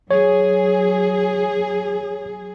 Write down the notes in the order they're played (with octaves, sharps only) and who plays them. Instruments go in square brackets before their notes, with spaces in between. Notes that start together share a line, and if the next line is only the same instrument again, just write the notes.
[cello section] F#3 G#4 [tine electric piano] C#5